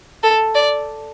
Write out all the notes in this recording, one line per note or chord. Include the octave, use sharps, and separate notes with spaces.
A4
D5